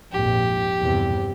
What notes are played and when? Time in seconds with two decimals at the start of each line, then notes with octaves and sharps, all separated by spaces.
0.12 A#1 F2 G#2 G4
0.79 E2 G2 C3